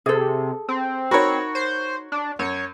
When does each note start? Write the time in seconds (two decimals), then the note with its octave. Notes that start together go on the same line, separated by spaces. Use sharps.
0.06 C3 G#4 A4
0.68 C4
1.11 D#4 F#4 A#4 C#5 B5
1.55 C5
2.12 D4
2.39 F#2 C#5